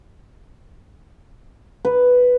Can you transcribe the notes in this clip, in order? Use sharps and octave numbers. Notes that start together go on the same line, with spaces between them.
B4